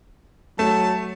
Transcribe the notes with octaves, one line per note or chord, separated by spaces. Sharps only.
F#3 A3 A5